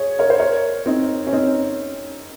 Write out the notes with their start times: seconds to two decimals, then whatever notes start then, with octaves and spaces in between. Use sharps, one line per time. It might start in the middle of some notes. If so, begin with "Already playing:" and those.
Already playing: G#4 C#5
0.19 A#4 C#5
0.30 C5
0.39 A#4 C#5
0.86 C4 D#4
1.27 C#4
1.33 C4 D#4